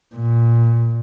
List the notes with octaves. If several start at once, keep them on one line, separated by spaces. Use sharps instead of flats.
A#2